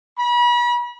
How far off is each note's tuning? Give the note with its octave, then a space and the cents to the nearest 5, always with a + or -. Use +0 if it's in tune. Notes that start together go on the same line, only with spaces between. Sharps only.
B5 -35